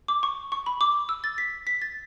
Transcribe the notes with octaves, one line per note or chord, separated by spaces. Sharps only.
D6
C#6
C#6
B5
D6
E6
A6
B6
B6
A6